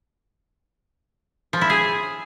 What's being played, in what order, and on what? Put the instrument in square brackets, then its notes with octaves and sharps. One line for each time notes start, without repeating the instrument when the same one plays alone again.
[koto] F3
E4
G#4